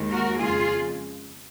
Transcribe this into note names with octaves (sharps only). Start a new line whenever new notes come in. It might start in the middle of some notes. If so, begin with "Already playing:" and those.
Already playing: D#2 D#3 G#3
F#4 A#4
F2 C#3 G#3 F4 G#4